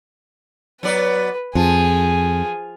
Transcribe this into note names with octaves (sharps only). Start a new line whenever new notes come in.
F#3 B3 B4 D5
F2 F3 G#4